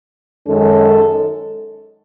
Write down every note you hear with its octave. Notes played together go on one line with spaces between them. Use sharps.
F#2 D#3 G#3 C#4 A4